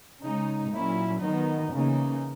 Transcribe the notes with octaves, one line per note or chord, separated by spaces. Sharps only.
C#3 G#3 D#4
A#2 F#3 C#4 E4
D#3 F#3 B3 D#4
C#3 E3 A#3 D#4